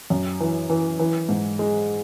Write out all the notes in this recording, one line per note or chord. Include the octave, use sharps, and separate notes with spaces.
F#2
E3
E3
E3
G#2
G#3